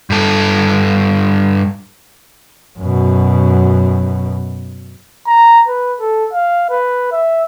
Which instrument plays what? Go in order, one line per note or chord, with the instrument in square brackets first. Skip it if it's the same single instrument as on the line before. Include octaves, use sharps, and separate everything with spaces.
[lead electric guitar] G2 A4
[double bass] F#2 B2
[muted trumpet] A#5
B4
A4
F5
B4
E5